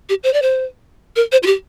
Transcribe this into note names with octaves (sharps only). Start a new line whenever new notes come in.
G4
C5
D5
C5
A#4
C5
F4
G4